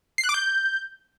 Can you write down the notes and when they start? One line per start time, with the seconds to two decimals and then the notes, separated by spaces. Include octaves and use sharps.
0.18 C7
0.24 F#6
0.29 D6
0.34 G6